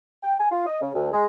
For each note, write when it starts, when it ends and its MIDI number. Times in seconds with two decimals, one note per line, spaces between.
0.23 0.34 79
0.39 0.46 80
0.50 0.65 65
0.66 0.80 75
0.81 0.89 49
0.93 1.09 38
1.12 1.25 56